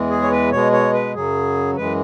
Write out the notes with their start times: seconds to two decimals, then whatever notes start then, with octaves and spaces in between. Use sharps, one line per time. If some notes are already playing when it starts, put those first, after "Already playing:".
Already playing: E2 E3 G#3
0.10 G#4
0.22 C#5
0.31 B4
0.51 B2 G#3 C#5
0.72 C#5
0.93 B4
1.14 F#2 C#3 F#3 G#4
1.77 F#2 E3 G#3 B4